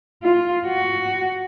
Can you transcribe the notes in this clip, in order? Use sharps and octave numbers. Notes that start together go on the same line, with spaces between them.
F4
F#4